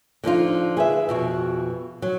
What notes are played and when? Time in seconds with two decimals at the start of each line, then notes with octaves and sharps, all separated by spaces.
0.24 D3 F3 D#4 F4
0.77 G#4 B4 E5
1.09 F2 B2 F#4
2.02 F#3